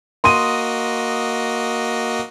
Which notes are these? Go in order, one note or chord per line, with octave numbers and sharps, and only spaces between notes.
A#3 F#4 D#5 C6 D#6 D#7